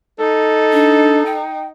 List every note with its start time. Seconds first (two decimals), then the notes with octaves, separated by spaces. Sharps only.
0.20 D#4 A4
0.73 D4
1.26 G5